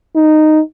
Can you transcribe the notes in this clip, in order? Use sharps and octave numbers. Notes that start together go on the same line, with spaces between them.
D#4